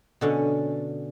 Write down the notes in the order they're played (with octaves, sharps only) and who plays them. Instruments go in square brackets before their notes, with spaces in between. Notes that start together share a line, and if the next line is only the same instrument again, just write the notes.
[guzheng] B2 D3 C#4